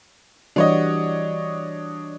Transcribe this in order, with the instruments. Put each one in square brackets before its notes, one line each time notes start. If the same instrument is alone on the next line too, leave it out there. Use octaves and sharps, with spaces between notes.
[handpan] E3 G3 F#4 [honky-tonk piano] D4 C#5 D#5